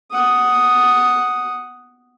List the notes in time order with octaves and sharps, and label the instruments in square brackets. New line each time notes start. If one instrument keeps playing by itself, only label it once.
[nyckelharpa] F#5 D#6